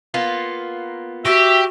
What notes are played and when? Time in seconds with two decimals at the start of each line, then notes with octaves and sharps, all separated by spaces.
0.14 A#3 B3 F4
1.25 F#4 G4 E5